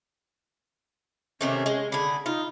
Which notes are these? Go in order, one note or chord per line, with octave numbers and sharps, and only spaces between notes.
C3 D#3 A3 C#4
G#3
D3 G#4 B5
D#4 F4